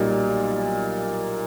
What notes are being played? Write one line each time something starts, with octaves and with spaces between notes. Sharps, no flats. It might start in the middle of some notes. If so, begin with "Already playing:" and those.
Already playing: B1 A#2 G3 A#3 D#4